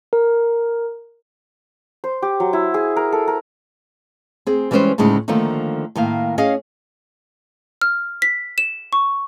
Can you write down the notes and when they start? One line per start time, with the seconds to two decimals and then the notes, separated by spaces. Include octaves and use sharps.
0.13 A#4
2.04 C5
2.22 G4
2.40 F#3
2.53 E4
2.74 G#4
2.96 A#4
3.12 A4
3.28 A#4
4.47 C4 G#4
4.71 E3 G3 G#3 C#4 B4 C5
4.98 D2 A2 C#3 G#3 C#4 D#4
5.28 D3 D#3 F3 A3 A#3
5.96 A2 D#3 A#3 F5
6.38 C#4 G#4 C#5 D#5 F5
7.82 F6
8.22 B6
8.58 E7
8.93 C#6